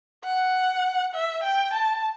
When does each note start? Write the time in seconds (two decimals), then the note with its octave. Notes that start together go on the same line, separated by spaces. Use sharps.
0.24 F#5
1.14 E5
1.43 G5
1.73 A5